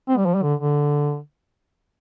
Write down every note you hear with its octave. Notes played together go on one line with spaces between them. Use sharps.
C4
G3
F3
G3
D3
D3